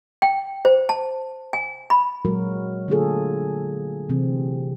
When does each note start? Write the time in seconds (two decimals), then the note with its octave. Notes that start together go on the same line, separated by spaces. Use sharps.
0.22 G5
0.65 C5
0.89 A5
1.53 G#5
1.90 B5
2.25 A#2 F#3 G#3 F#4 A#4
2.88 D3 A3 A#3 F4 G#4 A4
4.09 C3 E3 C4